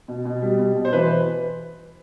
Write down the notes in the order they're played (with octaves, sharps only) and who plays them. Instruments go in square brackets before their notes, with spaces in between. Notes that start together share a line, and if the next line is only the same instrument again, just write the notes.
[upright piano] B2
B2
G3
B2
B2
C5
E3 B4